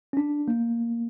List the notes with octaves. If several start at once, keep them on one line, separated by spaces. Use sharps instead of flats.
C#4
D4
A#3